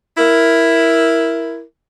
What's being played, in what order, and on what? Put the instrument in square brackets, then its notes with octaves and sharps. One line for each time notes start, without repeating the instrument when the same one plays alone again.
[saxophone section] E4 A#4